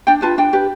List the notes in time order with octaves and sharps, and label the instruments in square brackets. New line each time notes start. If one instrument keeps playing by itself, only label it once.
[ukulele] D4 G5
F4 B4 A5
D4 G5
G4 B4